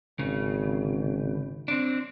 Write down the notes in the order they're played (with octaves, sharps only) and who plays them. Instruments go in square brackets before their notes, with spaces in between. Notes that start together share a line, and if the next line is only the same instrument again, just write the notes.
[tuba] G#1 [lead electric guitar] C#3
[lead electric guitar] C4 D4